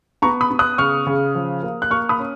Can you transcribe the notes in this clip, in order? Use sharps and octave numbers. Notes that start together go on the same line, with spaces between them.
B3 A#5 C#6
B5 D#6
B3
D#6 F#6
C#3 C#6 F6
C#3
F3
A#3
F#6
A#3 C#6 F6
B5 D#6
C#4